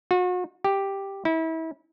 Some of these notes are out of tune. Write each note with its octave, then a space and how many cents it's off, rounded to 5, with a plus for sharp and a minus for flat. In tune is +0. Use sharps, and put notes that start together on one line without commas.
F#4 -40
G4 +0
E4 -30